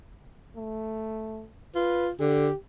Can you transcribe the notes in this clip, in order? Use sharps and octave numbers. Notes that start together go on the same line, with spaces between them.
A3
F4 B4
D3 G4